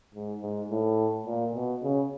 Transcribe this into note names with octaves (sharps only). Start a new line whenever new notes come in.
G#2
G#2
A2
A#2
B2
C#3